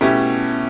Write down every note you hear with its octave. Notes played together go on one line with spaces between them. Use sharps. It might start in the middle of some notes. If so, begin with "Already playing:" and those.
B2 A3 C#4 E4 G4